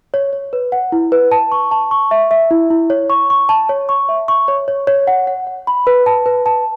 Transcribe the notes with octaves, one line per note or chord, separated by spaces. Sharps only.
C#5
C#5
B4
F#5
E4
B4
A5
C#6
A5
C#6
E5
E5
E4
E4
C#5
C#6
C#6
A5
C#5
C#6
E5
C#6
C#5
C#5
C#5
F#5
F#5
F#5
B5
B4
A5
B4
A5